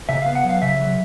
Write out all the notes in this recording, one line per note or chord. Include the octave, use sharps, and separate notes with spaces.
C#3 E5
B3 F5
F#5
F#3 F5
C#3 E5
F#3